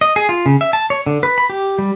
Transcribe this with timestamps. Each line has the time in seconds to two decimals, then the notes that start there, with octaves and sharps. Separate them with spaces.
0.01 D#5
0.16 G#4
0.29 F4
0.46 C#3
0.61 E5
0.73 A5
0.90 C#5
1.06 D3
1.23 B4
1.38 B5
1.50 G4
1.79 G3